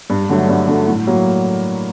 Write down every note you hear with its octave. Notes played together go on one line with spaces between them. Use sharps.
G2
D3 F#3 A3
G2
D3 F#3 A3
A2
F#3 A#3